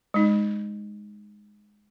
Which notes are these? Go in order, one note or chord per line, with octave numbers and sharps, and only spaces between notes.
G#3 D#4